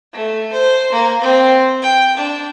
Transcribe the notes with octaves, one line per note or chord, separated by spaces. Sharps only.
A3
C5
A#3
C4
G5
D4